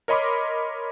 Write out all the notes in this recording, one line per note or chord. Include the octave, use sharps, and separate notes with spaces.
A#4 C#5 D#5 B5 C6 D6